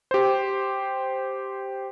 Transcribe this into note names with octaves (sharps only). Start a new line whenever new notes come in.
G4 C5